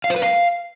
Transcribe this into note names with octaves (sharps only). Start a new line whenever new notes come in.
F5
C5
B4
F5